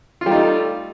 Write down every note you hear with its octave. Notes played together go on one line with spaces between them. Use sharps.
G3 A3 D#4 F4